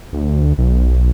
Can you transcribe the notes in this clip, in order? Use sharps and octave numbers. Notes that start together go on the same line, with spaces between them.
D2
B1